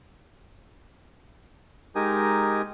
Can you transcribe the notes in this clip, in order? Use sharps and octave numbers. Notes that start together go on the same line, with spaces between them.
G#3 D#4 G4 A#4 G#5 D#6